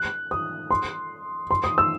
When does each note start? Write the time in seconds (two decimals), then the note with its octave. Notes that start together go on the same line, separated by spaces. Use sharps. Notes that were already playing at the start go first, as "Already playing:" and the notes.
Already playing: F#6
0.31 D#6
0.71 C6
1.51 C6
1.64 D#6
1.78 E6